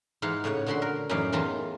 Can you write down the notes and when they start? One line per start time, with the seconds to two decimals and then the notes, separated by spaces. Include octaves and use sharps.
0.22 G#2 E3 D#4 F5 F#5
0.44 A2 C#3 C#5 F#5
0.66 A#2 D3 F#4 B5 C6
0.82 A#4
1.09 F#2 A2 E3 D#4 D5 F5
1.32 E2 D#3 E3 F4 A5 A#5